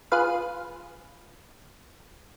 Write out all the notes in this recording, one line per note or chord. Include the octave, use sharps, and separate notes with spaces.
F4 G#4 B4 F5